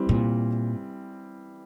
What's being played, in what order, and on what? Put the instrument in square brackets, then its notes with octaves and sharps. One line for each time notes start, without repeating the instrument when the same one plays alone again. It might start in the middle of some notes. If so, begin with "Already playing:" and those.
Already playing: [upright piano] E3 G3 C4
[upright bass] A#2